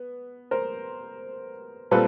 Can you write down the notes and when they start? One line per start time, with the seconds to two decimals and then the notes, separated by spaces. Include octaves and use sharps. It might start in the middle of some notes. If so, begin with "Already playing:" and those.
Already playing: B3
0.51 A#4 C5
1.91 A#2 G3 C4 A4 B4